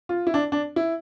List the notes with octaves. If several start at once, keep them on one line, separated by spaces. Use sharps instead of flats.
F4
E4
D4
D4
E4